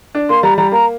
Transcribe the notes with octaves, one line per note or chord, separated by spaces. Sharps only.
D4
A#3 C6
G3 A#5
G3 A#5
A#3 A#5